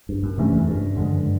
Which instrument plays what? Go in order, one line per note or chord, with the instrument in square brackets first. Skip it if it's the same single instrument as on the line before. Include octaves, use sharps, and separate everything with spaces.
[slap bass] G2
F#2
[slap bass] G2 [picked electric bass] C3 E3 A3 C#4
[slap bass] F2
G2
[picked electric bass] F#2 D3 F3 G#3